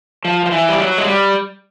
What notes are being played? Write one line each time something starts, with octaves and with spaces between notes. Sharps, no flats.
F3
F3
E3
G3
F#3
G#3
G3